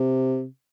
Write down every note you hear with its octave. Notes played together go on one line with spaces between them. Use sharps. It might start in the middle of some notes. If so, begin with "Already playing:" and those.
Already playing: C3